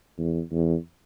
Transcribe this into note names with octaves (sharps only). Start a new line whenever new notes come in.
E2
E2